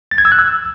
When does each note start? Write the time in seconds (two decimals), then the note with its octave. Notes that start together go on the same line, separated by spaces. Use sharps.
0.11 A6
0.18 G#6
0.25 E6
0.32 F#6
0.39 E6